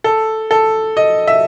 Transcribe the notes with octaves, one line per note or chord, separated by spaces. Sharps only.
A4
A4
D#5
E5